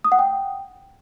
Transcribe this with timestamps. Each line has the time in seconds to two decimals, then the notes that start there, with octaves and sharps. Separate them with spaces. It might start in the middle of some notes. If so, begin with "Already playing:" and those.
0.04 D#6
0.12 F#5
0.19 G5